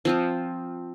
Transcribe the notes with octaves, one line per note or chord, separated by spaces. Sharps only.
F3 C4 F4